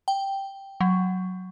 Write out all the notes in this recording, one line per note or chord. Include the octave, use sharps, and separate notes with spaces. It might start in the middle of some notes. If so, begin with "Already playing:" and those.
G5
F#3